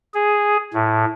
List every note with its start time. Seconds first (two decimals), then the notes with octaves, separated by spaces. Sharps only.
0.14 G#4
0.74 A2